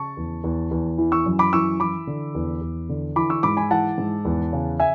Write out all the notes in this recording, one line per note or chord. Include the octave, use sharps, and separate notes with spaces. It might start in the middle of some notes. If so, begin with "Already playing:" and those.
Already playing: C#3 A5 C#6
E2
E2
E2
E3
C#6 E6
F#2
B5 D6
E3 C#6 E6
E3 B5 D6
D3
E2
E2
D3
E3 B5 D6
C#6 E6
G#2 B5 D6
G#5 B5
E3 F#5 A5
G#2
E2
C#3
E5 G#5